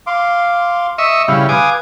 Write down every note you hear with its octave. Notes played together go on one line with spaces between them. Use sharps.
F5 C6 D6
D#5 E5 C#6 E6
C#3 G3 E4 F5
B4 F5 G#5 D6 D#6